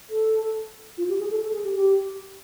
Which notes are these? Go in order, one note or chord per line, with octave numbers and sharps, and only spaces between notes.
A4
F4
G4
G#4
A4
A4
G#4
G4
G4